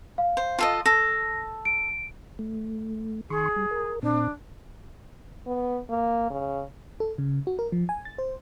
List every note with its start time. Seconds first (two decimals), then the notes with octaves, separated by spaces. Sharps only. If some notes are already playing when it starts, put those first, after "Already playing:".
0.18 F5
0.37 C5
0.59 F4 A4 D#5
0.86 A4 A#6
1.65 D7
2.39 A3
3.30 D#3 G#4 C6 C#6
3.56 G3
3.71 A#4
4.03 A#2 C4 D4
5.46 B3
5.90 A#3
6.30 C#3
7.00 A4
7.18 C#3
7.47 F#4
7.59 A#4
7.72 F3
7.89 G#5
8.05 A6
8.18 C5